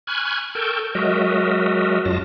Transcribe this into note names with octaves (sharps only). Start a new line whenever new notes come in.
G#5 B5 C#6 F6 F#6 G#6
A4 A#4 G5 A5 C#6 G6
F#3 G#3 F#4 A#4 D#5 E5
F#2 F#3 F4 A5 A#6